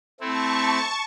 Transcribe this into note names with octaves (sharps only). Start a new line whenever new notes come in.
A3 C4 E4 A5 C#6